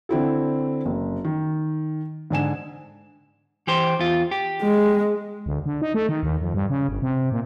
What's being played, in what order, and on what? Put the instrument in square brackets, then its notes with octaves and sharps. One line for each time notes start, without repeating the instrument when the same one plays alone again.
[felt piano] D3 C4 E4 A4
F#1
D#3
G#2 D3 G#5 E7
[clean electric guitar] E3 G4 C5
E2 F4
G4
[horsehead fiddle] G#3
[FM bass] D2
D3
D#4
A3
D#3
D#2
F2
G2
C#3
G1
C3
A#2